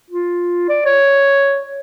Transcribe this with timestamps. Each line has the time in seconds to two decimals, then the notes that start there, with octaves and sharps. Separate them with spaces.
0.11 F4
0.69 D5
0.86 C#5